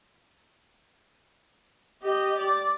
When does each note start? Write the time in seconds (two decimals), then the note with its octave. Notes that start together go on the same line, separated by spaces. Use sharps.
2.03 G4 D#5
2.38 D5